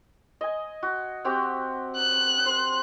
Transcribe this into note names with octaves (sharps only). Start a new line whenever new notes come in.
D#5 G#5
F#4
C4 F#4 G4
F#6
C5